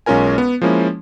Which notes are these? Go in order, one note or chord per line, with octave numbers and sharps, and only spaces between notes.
B1 G#3 C#4 F4 A#4 G#5
B3
F3 G#3 A#3 C#4 E4